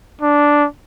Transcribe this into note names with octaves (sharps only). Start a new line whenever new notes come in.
D4